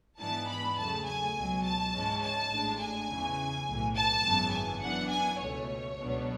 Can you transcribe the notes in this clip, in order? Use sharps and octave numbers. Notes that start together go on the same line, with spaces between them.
G#2 E3 B3 D4 A5
B5
E2 C#3 F#3 A3 A5
G#5
C#2 B2 F#3
A5
G#2 E3 G#3 C#4
A5
A1 A2 G#3 D4
G#5
E2 C#3 E3
B1 A2 E3
A5
G#1 F#2 C#3 E3 B3
G#5
F#2 E3 B3 D4 F#5
G#5
C#2 B2 A3 C#5
C#2 B2 F#3 B3 D4